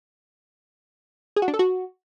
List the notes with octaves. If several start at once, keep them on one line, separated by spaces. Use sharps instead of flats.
G#4
F#4
D4
A4
F#4